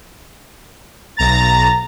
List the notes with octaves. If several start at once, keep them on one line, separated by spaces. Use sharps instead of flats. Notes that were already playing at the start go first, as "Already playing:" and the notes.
B1 A#5 A6